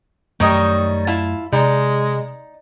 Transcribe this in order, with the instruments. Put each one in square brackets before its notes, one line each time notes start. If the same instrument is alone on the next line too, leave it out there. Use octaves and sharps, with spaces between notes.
[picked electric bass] F#2 A3 [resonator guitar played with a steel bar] D#3 G3 [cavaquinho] D#4 C#5 D#5
[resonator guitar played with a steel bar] E4 A5 [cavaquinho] F4
[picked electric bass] C3 [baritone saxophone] G#3 [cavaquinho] D#4 [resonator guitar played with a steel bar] D5